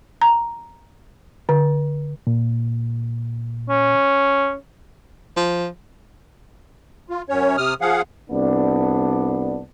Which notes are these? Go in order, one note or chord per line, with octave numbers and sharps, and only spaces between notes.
A#5
D3
A#2
C#4
F3
F4
F#2 C#4 C#5
C3 D#6 F6
F3 G#4 F5 F#5
C2 B3 D4